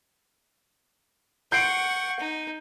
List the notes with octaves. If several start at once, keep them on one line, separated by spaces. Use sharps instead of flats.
F#5 C#6 G6 C7 D7
D#4